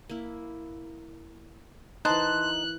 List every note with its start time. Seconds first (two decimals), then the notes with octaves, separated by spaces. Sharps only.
0.09 A#3 E4
2.05 E3 D#4 A#4 C5 A5 F#6